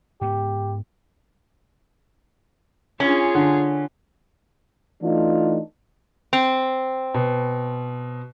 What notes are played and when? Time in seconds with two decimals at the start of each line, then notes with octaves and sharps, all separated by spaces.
0.21 G#2 B3 G4
3.00 C#4 F4 G#4
3.35 D3
5.03 E3 A3 D4 D#4 F4
6.33 C4
7.14 B2